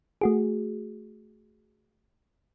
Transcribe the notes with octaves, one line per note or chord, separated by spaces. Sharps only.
A3 F#4 G#4